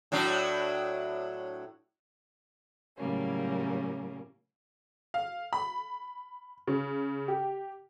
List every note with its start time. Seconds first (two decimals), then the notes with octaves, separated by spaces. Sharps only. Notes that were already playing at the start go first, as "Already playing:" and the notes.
0.12 A2 F#3 D4
2.96 A2 C#3 F#3 G3 A#3 C#4
5.14 F5
5.53 B5
6.67 C#3
7.28 G4